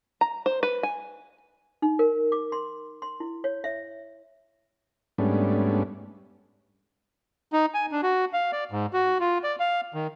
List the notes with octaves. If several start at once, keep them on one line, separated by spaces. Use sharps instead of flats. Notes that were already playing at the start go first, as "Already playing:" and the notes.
A#5
C5
B4
G#5
D#4
A#4
D6
C6
C6
E4
C#5
E5
G#2 G3 A3 B3 C#4 D4
D#4
G#5
D4
F#4
F5
D5
G#2
F#4
F4
D5
F5
D#3